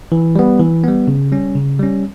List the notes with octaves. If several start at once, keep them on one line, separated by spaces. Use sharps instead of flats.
E3
G3 B3
E3
G3 B3
C#3
G3 C#4
C#3
G3 C#4